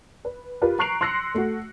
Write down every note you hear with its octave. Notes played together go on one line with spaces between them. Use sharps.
B4
F4 G4 A#4 B4
A#5 C#6 F#6 C7 D7 F7
C6 E6 F#6 A#6 C7 C#7
A3 F#4